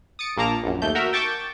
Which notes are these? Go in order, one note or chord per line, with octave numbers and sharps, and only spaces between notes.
D#6 A6 C#7 D7
A#1 A#2 A#3 A5 A#5 D6
A#1 F#2
D#2 A3 G6
F#4 A#4 E5
G5 A5 C#6 D6 G6 A6